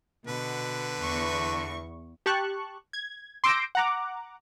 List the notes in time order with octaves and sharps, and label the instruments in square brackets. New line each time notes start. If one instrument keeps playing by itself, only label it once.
[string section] B2 [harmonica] D3 B4
[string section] E2 C#6
[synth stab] G4 A5 C#6 F#6
G#6
C6 D6 E6 G6 A#6 D7
F#5 A#5 D6